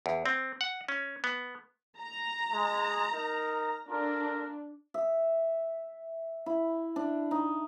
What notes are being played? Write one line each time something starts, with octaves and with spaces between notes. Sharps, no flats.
E2
C4
F#5
C#4
B3
A#5
G#3
D#4 A#4
D4 F4 A4 A#4
E5
E4
D4
D#4